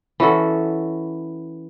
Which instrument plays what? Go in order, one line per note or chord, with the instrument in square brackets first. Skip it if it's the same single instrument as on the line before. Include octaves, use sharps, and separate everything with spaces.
[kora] E3 C#4 F#4 A4